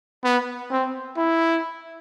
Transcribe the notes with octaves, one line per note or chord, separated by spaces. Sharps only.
B3
C4
E4